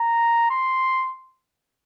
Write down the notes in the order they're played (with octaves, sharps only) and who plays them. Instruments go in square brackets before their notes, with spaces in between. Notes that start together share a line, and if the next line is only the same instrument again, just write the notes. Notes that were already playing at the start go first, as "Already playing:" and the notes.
Already playing: [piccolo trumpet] A#5
C6